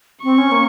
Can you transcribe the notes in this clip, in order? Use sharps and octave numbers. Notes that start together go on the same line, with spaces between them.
C4 C#6
C#4
A#3